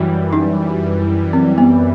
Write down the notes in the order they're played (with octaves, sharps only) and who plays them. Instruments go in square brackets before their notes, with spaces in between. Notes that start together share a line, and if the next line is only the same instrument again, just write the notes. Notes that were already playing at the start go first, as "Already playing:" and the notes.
Already playing: [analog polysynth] F#2 E3 G3 [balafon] F#4
[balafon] D#4
C4
B3